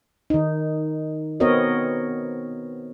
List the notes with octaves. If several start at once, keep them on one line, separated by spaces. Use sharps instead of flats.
D#3 D#4
B3 C4 F#4 A#4 C#5 D#5